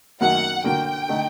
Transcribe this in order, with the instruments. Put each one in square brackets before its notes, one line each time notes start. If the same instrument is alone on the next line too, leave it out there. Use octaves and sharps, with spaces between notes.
[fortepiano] F#2 D#3 F#3 A#3 [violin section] F#5
[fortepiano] D3 F#3 A#3 F#4 [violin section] G5
[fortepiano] D3 A3 D#4